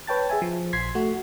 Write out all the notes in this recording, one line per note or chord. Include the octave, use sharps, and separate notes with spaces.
B4 C#5 G5 A5 A6
G#4 E5 G#5
F3
A#1 C6 G#6 B6 C7
A3 F#4